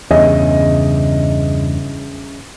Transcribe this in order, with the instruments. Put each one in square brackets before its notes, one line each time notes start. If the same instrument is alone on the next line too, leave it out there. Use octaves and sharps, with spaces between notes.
[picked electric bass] E2 G2 [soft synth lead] C#3 [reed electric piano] C#4 G#4 E5 [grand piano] D#5